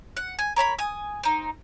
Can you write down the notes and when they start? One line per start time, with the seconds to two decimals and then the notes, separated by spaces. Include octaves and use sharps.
0.17 F#5
0.39 G#5
0.56 A#4 C#5 A5 B5
0.79 G#5 D#6
1.23 C4 D#4